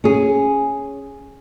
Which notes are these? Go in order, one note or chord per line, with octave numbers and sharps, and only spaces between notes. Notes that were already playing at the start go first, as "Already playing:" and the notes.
C#4 G#4